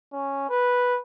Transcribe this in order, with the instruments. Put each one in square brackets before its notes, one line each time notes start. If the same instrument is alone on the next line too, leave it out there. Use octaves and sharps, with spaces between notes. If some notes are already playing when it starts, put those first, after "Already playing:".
[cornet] C#4
B4